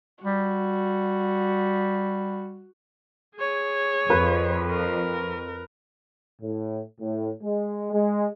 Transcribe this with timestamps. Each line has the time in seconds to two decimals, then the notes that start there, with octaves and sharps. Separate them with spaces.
0.24 G3 F#4
3.37 G#4 C#5
4.10 F2 B4
4.69 A#4
6.41 A2
7.00 A2
7.43 G#3
7.92 G#3